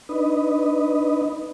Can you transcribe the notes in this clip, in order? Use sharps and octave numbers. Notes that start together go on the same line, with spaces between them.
D4 D#4 B4 D#5